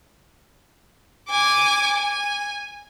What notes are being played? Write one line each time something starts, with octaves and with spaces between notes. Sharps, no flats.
G#5 D6
G#5